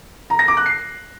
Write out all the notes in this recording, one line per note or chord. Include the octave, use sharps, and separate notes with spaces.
A#5
A#6
D6
F#6
C7